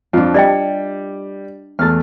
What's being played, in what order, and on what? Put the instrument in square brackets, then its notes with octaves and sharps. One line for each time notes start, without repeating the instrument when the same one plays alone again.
[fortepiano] F2 [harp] D4 F4
[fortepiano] G3 [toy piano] D5 D#5 G5
[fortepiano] E2 A3 [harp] F6 A6